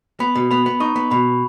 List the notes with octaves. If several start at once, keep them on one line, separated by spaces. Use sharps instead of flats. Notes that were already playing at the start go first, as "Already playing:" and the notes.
B3 B5
B2
B3 B5
B3
D#4 C#6
B3
B2 B5